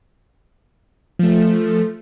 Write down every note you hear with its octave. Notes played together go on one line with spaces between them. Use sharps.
F3 A3